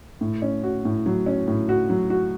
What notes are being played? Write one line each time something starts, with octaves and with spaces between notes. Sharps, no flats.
A2
C#4
F#4
A2
F#3
C#4
A2
F#4
F#3
F#4